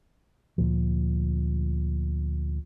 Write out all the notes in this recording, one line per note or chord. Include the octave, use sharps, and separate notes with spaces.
D2 A#2 F3